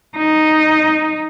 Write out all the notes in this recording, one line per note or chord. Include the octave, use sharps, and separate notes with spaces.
D#4